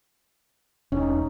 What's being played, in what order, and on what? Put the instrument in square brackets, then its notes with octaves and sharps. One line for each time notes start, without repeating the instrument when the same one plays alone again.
[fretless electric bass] E1 [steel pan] C#4 D#4